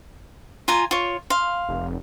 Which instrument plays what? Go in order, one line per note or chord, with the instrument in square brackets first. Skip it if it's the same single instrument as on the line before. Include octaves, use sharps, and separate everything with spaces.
[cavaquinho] F4 G#5 A#5
F4 C#5
F5 C6
[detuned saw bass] F1